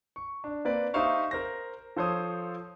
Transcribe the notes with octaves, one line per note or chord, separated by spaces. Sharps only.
C#6
D4
A#3 C4 B4 D5
D#4 G4 C5 E5 F5 C#6
A#4 C5 A#6
F3 A4 C5 C#5 D#6